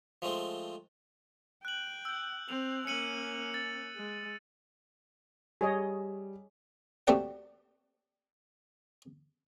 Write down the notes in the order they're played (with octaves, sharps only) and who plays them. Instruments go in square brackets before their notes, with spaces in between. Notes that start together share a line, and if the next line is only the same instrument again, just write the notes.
[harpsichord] F3 G#3 A3 C4
[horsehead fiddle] G5 [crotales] F#6 F#7
[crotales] E6 G6
[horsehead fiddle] C4 [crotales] F7
[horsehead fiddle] A#3 C#4 [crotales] C#7 D#7 F#7
[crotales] A6
[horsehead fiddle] G#3
[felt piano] G3 [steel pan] G#4 C#5 D#5
[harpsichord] A3 C4 F#4 G4 D5 F#5